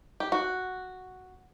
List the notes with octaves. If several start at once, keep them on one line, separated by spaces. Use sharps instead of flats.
G4
F#4